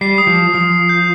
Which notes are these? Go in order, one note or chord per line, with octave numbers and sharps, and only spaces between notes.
G3 C7
D#6
F3
D#6
F3 D#6
D#6
G6